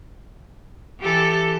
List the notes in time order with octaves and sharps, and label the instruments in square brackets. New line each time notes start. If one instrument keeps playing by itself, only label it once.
[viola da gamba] E3 G4 A4